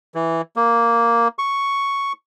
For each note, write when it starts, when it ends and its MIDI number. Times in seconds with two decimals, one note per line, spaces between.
0.15 0.42 52
0.56 1.28 58
1.39 2.12 85